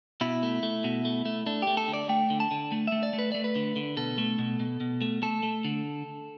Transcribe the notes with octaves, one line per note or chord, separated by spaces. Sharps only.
B2 E4
A3
A3
B2
A3
A3
A3 D4
A3 G4
A4
D3
D5
A3 G5
D3
A5
D3
A3
A3 E5
D5
A3
B4
A3 D5
B4
D3
D3
B2 A4
A3
B2
B2
B2
A3
A3 A4
A3
D3